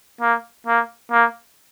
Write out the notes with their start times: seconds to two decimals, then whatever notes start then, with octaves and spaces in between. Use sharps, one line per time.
0.21 A#3
0.67 A#3
1.12 A#3